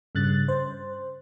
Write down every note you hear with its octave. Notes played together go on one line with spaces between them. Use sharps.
G2 C#3 F#6 A6
C5